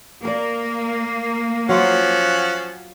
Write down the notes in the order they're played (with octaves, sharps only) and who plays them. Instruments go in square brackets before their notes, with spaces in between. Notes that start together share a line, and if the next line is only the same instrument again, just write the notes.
[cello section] A#3 [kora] A#4 D5
[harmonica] F3 C#4 F#5 [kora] F#3 F4